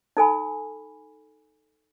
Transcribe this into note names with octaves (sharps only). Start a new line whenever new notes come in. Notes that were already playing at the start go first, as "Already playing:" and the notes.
D#4 A4 G#5 B5